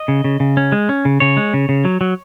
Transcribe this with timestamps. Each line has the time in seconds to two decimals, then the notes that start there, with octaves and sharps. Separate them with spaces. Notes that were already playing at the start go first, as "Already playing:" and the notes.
Already playing: D#5
0.08 C#3
0.24 C#3
0.40 C#3
0.57 C#4
0.72 G#3
0.89 C#4
1.05 C#3
1.20 C#3 C#5
1.37 G#3
1.54 C#3
1.69 C#3
1.85 F#3
2.01 F#3